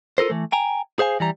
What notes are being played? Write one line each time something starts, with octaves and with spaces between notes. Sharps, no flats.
F4 A4 A#4 C5
E3 A3
G5 G#5 A#5
G#4 C5 F5 G#5
E3 G3 A#5